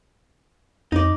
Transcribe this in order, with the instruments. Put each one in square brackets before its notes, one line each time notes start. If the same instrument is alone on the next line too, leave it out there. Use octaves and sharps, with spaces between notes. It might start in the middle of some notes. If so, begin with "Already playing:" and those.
[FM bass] F2 [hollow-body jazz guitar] D#4 D5